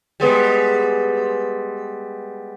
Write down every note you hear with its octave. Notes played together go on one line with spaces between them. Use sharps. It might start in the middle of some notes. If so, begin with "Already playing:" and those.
G3 G#3 B3